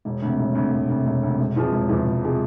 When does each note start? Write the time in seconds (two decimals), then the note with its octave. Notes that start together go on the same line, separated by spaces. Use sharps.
0.05 E1
0.22 D2 C3
0.39 E1
0.55 D2 C3
0.72 E1
0.89 D2 C3
1.06 E1
1.23 D2 C3
1.39 E1
1.56 E2 C3 F3 G#3
1.72 E1
1.88 E2 C3 F3 G#3
2.05 E1
2.23 C3 F3 G#3